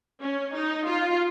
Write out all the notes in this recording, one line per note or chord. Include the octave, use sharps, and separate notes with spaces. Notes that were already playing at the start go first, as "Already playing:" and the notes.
C#4
D#4
F4